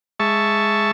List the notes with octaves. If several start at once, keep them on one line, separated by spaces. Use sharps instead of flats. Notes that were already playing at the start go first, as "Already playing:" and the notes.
G#3 E5 A5 C#6